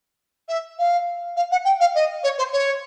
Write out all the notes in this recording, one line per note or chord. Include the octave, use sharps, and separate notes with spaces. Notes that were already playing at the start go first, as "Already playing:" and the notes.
E5
F5
F5
F#5
G5
F5
D#5
C#5
C5
C#5